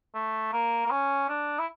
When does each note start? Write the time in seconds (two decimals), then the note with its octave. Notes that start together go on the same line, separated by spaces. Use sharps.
0.15 A3
0.53 A#3
0.87 A#3
0.91 C#4
1.29 D4
1.59 E4